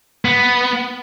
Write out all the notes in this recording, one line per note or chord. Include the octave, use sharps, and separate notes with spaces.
B3